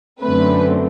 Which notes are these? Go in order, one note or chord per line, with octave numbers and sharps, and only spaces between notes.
F#2 D3 A3 C4 B4